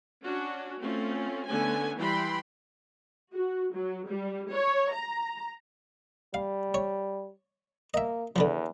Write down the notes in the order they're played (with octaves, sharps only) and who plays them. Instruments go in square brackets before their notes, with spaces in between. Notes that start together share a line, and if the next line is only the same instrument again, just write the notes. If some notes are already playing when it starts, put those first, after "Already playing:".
[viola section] C#4 D4 F#4
A3 C4 C#4 F4
D3 A3 B3 C#4 G#5
E3 G3 G5 B5 C6
F#4
F#3
G3
C#5
A#5
[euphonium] G3 [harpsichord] F5
[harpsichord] C#5
[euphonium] A#3 [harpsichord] D#5 E5
[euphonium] E2 [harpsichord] D3 E3 F3